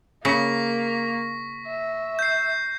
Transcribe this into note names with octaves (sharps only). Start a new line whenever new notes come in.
C#3 A#3 C#6 A#6 B6
E5
G6 C7